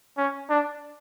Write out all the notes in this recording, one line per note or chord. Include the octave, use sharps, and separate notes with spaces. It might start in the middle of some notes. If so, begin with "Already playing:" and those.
C#4
D4